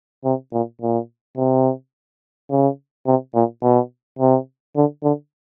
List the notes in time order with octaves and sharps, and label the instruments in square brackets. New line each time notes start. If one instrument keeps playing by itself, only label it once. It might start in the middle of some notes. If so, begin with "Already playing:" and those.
[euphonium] C3
A#2
A#2
C3
C#3
C3
A#2
B2
C3
D3
D3